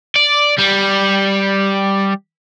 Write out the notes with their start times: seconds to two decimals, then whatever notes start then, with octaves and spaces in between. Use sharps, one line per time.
0.16 D5
0.59 G3